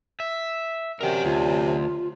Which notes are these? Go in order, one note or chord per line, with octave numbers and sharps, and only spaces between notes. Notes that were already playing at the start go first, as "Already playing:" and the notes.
E5
F#2 C3 A#4 D5 G5
D2 F4